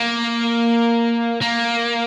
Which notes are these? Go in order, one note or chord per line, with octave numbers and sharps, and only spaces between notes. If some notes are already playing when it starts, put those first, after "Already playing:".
Already playing: A#3
A#3